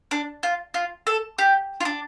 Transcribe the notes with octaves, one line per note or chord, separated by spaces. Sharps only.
D4
F4
F4
A4
G4
F4
D4